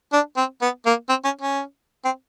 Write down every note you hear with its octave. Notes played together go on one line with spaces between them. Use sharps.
D4
C4
B3
A#3
C4
C#4
C#4
C4